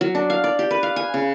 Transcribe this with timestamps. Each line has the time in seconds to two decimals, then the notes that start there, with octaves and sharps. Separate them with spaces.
0.01 F#3
0.15 D4
0.30 F5
0.44 D5
0.59 G4
0.71 B4
0.83 F5
0.96 G#5
1.14 C#3